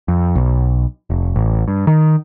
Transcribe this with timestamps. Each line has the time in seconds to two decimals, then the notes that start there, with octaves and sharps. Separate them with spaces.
0.08 F2
0.35 B1
1.10 F1
1.36 A1
1.68 G2
1.87 D#3